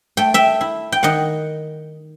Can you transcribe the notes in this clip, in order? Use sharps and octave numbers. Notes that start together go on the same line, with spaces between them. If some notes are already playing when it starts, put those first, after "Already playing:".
A3 G5
E5 G5
E4
G5
D#3 D#5 F#5